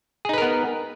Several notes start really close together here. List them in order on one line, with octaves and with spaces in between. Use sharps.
G#4 D#4 B4 A#4 B3